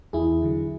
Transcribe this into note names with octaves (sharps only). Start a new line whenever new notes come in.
E2 E4 G#4
D3 F#3